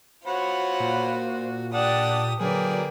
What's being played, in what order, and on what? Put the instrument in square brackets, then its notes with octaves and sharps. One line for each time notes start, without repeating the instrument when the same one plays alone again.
[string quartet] F4 C5 [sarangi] F#4 [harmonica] C#5 F#5 B5
[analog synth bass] A#2
[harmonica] D4 F#5 A5 [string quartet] G4 D#6 [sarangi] D5
[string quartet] D3 B4 D5 [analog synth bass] F#3 [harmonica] A#3 G#4 [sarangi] G5